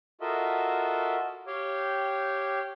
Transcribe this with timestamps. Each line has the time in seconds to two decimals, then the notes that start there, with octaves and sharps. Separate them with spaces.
0.21 F4 F#4 A4 A#4 D#5 E5
1.47 G4 C#5 F5 G5